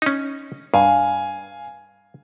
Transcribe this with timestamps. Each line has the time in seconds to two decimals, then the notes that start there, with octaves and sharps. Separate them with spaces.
0.02 C#4 D#4
0.74 G2 F5 G#5